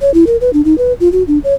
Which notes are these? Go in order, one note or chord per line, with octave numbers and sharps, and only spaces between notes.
C#5
E4
A#4
B4
D4
D#4
B4
F4
F#4
D4
C#5